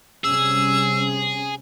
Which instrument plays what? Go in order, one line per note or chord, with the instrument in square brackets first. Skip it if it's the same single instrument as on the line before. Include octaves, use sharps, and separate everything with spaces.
[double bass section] C3 G3 C#4 [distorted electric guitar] G#4 [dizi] E6